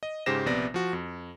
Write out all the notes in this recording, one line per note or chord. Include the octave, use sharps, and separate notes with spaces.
D#5
G#2 C#3 G4 C5 A#6 E7
A#1 C3 B3 D5 A#6
F3 F#4
F2